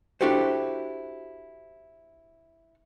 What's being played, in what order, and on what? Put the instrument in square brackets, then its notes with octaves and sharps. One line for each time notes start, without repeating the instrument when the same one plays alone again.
[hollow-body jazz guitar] D4 E4 F#4 G4 A4 C5